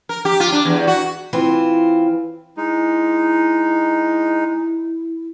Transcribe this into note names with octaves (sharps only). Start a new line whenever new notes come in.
A#4
G4
F4
D4
E2
F#4
E3 C4 F4
G#3 D#4 E4